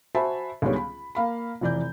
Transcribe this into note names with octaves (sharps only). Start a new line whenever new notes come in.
F#4 C5 E5 G#5 A5 B5
C#2 D3 D#3 G3 B3 C#4
B5
A#3 F5 B5
F1 E3 D5 G6